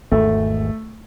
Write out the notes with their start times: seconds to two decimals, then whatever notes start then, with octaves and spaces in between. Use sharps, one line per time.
0.11 G#1 E2 G#2 A3